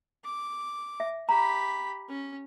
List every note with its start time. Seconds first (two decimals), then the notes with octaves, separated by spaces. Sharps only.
0.24 D6
1.00 E5
1.29 G4 A#5 B5
2.09 C#4